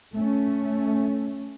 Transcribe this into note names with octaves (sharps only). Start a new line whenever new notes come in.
A3 C#4